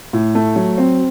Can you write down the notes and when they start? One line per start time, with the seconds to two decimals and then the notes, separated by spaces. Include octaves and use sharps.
0.13 A2
0.35 A3
0.56 F#3
0.78 C4